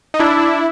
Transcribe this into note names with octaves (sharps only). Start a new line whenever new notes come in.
D#4
D4 E4